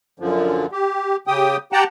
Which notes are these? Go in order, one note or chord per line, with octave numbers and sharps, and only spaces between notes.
F#2 D3 F3
G4
C#3 G4 G5 D#6
G4 F#5 G5 A5 A#5